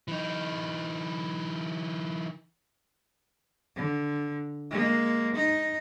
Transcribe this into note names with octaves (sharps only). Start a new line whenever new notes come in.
E3 D#4
D3
G#3 A#3
D#4